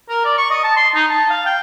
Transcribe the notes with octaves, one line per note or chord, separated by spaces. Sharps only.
A#4
D5
C#6
D#5
A5
C6
D#4
A5
F5
G5